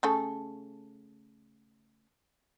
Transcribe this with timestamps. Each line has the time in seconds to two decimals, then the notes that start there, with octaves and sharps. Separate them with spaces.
0.03 C#3 A3 A4